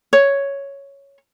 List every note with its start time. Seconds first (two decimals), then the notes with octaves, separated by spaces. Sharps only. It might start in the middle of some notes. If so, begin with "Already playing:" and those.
0.13 C#5